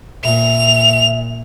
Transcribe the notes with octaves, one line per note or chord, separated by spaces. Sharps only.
A#2 E5 F7